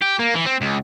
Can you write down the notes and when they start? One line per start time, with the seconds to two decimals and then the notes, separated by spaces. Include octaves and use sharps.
0.02 G4
0.19 A#3
0.35 E3
0.46 C4
0.62 C#2